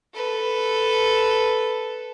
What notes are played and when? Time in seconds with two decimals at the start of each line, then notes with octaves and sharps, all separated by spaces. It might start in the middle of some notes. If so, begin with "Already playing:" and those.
0.14 A4 B4